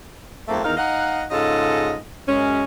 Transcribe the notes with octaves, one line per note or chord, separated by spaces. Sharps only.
F2 G#2 A3 A#3 C4 A4
E2 D#3 D#4 A#4 F5
D#4 D#5 F5 F#5
G#2 C#3 F4 A4 D#5
F#2 G#3 C#4